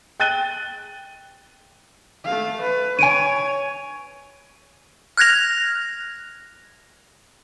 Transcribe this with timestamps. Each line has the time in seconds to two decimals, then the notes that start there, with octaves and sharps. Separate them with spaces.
0.20 G5 F#6 A6 D#7 G7
2.25 A3 F5
2.61 B4
2.99 C#5 G#5 D7 D#7
5.17 F6 F#6 G#6 A#6 F7